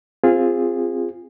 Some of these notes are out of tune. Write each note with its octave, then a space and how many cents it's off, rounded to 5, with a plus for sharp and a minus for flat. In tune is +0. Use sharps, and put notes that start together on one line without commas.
C4 +0 F4 +0 G#4 -20